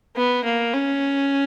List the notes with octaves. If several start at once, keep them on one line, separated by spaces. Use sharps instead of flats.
B3
A#3
C#4